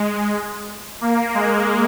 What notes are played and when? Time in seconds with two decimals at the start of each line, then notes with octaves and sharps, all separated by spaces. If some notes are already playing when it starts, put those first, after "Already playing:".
Already playing: G#3
1.01 A#3
1.34 G#3